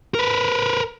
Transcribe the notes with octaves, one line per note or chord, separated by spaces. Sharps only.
A#4 B4